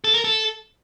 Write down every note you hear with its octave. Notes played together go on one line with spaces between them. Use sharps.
A4
A#4
A4